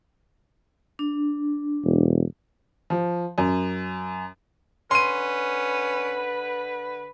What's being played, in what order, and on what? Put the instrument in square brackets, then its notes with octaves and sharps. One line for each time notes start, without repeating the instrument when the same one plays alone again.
[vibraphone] D4
[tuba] E1
[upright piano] F3
F#2
[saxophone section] D3 B4 [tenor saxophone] C#4 [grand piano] C6 D#7